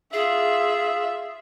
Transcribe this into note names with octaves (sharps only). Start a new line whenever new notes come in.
F4 G#4 E5